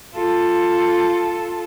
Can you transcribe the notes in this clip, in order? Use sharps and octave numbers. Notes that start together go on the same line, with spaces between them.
F4 A4